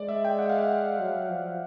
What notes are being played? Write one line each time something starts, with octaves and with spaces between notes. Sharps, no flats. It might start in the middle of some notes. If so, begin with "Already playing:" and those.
Already playing: G#3 D5
E5
G5
F#5
F5
F#5
F#3
F3